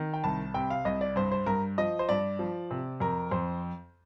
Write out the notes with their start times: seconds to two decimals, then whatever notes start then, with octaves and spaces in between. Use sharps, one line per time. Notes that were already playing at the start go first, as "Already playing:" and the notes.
Already playing: D#3
0.14 G5
0.24 C2 A5
0.54 C3 G5
0.70 F5
0.85 C2 D#5
1.01 D5
1.16 G2 C5
1.32 C5
1.46 G2 A#4
1.78 F3 D#5
1.99 C5
2.09 G2 D5
2.39 F3
2.71 C3
3.00 F2 A#4
3.31 F2 C5